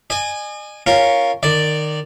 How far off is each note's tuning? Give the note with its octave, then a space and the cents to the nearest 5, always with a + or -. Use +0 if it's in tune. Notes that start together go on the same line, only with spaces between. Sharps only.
D#5 -45 G#5 +0
C#4 +0 F4 +0 A#4 +0
D#3 -25 D5 +0